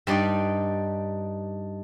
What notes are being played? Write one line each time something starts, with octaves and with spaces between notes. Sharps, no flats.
G2 G3 D#4 D5 G5